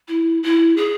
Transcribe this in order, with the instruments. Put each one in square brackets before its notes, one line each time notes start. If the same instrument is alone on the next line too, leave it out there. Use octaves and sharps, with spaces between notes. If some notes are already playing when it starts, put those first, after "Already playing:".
[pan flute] E4
E4
G#4